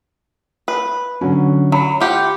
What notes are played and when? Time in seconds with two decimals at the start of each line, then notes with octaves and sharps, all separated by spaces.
0.68 B4
1.21 D3 F#3 C#4
1.72 F#3 B5
2.00 F4 G4 F#5